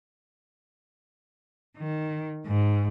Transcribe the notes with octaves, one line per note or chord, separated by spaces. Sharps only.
D#3
G#2